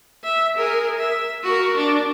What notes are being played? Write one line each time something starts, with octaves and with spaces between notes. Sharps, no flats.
E5
G#4 A#4
E5
F#4 A#4
D4